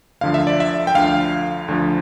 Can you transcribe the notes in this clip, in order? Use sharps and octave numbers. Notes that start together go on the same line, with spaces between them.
D2 D3 F3 F5
E5
D5
E5
G5
D2 D3 F3 F5
D2 D3 F3